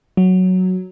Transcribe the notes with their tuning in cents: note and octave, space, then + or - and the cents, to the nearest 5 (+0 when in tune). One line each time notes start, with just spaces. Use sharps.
F#3 +0